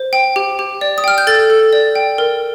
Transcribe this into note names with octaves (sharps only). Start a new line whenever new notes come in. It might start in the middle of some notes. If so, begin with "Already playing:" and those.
Already playing: C5
G5
G4
G4
D5
D#6
G5 F6
G6
A4 A6
A4
D5
G5
A#4